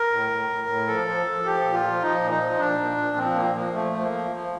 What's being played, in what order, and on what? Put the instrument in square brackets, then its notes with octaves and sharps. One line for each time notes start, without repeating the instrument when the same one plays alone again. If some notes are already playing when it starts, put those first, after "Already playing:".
Already playing: [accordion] A#4
A2
A2
A2
A2
F3 A4
F3
F3
F3 G4
A#2
F4
F3
F3 D#4
A#2
D#4
F3
A#2 D4
A#2
A#2
F3 C4
A#2 A#3
F3 A#3
F3 A3
F3
A#3
F3
F3